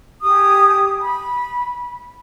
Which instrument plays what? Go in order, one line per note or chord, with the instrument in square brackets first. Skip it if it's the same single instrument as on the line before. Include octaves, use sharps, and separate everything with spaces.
[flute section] G4 G#4 D#6
B5